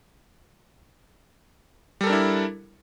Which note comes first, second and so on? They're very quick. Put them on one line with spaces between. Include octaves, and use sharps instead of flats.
G3 A4 A#4 D4 E4